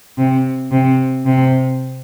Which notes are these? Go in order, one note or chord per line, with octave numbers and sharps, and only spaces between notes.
C3
C3
C3